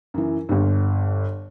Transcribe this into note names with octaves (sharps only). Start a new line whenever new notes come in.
F#2 E3
G1 G2